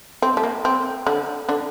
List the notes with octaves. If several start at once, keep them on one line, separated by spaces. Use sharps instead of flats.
C4
A3
A#3
C4
D3 D4
D3 D4